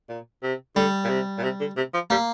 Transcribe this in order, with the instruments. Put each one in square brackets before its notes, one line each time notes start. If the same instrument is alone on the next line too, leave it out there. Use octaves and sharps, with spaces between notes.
[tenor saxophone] A#2
C3
[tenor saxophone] D3 [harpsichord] G3
[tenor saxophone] A#2
C3
A#2
C3
D3
C3
F3
[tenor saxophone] G3 [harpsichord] A#3